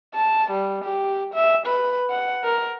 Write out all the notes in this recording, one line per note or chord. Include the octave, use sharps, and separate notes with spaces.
A5
G3
G4
E5
B4
F#5
A#4